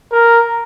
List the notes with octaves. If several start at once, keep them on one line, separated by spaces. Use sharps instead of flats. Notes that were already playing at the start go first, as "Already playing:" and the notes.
A#4